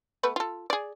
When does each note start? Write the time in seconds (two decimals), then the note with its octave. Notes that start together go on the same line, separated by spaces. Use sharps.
0.23 A3 B3 B4
0.36 F4 A4
0.70 G#4 D5